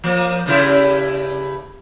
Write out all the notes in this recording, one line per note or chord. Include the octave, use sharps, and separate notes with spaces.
F3 A#3
G2 C#3 E4